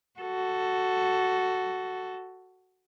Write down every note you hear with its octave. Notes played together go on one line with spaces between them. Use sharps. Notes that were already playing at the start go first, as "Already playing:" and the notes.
F#4 A4